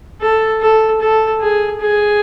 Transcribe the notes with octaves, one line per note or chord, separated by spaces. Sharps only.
A4
A4
A4
G#4
G#4